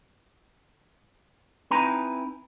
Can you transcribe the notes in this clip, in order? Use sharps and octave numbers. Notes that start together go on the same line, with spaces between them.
C4 D#4 E4 B4 G#5 A#5